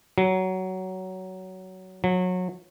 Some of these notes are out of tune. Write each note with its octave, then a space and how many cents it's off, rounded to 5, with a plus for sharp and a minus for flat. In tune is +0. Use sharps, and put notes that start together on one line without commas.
F#3 +15
F#3 -25